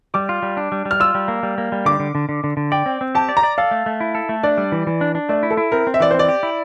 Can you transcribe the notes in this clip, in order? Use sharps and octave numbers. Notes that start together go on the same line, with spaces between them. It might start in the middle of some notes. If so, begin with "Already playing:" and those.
G3 D6
F4
G3
D4
G3
G3
F6
F4 E6
G3
A#3
G3
A#3
G3
D3 D6
D3
D3
D3
D3
D3
D5 G5
C4
C4
G4 A5
D5
A#5
D5
A4 F5
A3
A3
E4
A4
A3
D4 D5
G3
E3
E3
D4
D4
A3 D5
E4
A4
E4
C4 A#4
C4
E5
E3 D5
C4 C5
D5
G4
E4